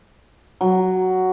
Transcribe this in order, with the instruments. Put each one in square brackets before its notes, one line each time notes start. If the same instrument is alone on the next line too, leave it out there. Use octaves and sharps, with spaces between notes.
[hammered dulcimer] F#3